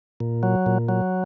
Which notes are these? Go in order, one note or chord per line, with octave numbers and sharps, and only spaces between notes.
A#2
F#3
A#2
F#3